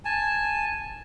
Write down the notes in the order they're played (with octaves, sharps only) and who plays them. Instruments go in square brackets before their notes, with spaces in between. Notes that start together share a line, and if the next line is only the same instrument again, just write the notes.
[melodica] G#5 A5